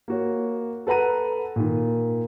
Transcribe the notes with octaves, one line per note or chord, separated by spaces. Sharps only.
A#3 F#4 C#5
A4 B4 F#5 A#5 D#7
A#2 D#3